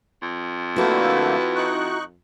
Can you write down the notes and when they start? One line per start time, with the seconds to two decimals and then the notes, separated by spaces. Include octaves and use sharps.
0.22 F2
0.76 D3 A3 A#3 E4 F#4 B4
1.56 D#4 C#6 F#6